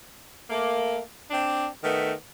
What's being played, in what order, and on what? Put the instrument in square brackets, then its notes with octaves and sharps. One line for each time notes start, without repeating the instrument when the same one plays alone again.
[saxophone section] A3 A#3
C4 D4
D#3 A3 B3